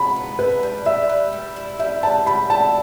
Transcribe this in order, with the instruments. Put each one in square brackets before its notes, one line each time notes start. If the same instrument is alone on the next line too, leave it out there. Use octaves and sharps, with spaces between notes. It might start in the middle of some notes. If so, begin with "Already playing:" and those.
Already playing: [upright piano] B5
[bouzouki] B3
[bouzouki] E4 [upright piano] B4
[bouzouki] G3
[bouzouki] G3 [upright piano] E5
[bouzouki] B4
G3
E4
[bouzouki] G3 [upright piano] E5
[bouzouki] B4 [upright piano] A5
[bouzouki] G3 [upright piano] B5
[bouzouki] E4 [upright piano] A5